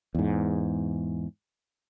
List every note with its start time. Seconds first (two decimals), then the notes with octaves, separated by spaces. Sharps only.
0.15 E2 G#2